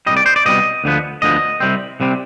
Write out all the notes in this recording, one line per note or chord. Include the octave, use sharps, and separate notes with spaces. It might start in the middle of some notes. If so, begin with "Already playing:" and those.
C2 B2 G3 D#5
D5
C5
D5
C2 B2 G3 D#5
D2 D3 F3 B3
D2 D3 F3 B3 D#5
C2 C3 G3 C4
C2 C3 G3 C4